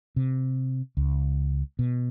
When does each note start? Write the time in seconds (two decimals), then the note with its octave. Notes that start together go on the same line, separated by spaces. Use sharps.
0.16 C3
0.97 C#2
1.79 B2